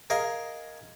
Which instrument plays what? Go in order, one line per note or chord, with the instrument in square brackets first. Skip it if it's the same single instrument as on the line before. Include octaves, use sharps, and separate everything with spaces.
[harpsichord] G#4 A#4 D#5 F5